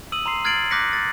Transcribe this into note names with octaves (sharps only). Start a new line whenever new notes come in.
D#6 E6 D#7 F#7
A#5 C6 C7
F6 G#6 A6 C7 D7 F#7
D6 F#6 G6 A#6 B6 C#7
A6